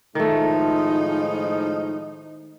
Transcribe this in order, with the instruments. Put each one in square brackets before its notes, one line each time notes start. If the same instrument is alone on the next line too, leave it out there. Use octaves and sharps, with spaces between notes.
[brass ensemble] A2 F3 G#3 [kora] D#3 A3 [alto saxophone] D#4